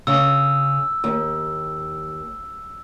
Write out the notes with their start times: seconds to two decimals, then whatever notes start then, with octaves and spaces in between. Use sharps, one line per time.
0.07 C#3 E6
1.04 D#2